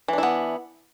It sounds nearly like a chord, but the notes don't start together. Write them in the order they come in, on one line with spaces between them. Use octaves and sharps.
E3 D4 E4 B3